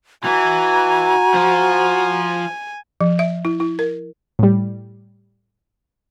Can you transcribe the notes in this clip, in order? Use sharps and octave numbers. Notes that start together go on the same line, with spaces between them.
E3 F#4 G#5 A#5
F3
F3
E5
E4
E4
A#4
A2 G3